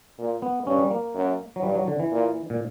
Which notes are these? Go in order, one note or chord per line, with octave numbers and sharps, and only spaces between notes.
A#2
B3
G2 C#4
G3
A#3
F#2
F#3
G2 G3
F#3
D3
E3
A#2
A#2